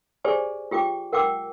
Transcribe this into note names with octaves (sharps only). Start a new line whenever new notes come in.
G4 G#4 C5 D5 G#5
F4 G4 G5 D6
A#4 F#5 G5 D6 E6